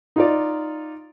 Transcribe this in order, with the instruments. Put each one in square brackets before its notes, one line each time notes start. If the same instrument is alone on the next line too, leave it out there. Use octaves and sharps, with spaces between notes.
[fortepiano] D#4 F4 D5